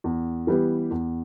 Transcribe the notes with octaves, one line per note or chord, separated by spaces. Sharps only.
E2
E3 G3 B3
E2